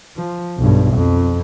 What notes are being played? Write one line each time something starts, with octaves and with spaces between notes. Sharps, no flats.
F3
B1 G2
F2